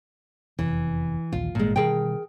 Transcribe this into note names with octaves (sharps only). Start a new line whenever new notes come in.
F1 E2 C3 E3
A#1 D#2 F4
G#1 A#2 G#3
B2 D#3 G3 G#4 A#4 G5